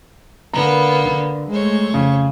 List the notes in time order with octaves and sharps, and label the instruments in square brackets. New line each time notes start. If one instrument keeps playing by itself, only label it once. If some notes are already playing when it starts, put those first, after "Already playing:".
[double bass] D3 [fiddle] A#3 B3 [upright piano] A#5
[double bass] D3
[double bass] G#3 A3 [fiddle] C5 C#5
[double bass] F2 [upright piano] C#3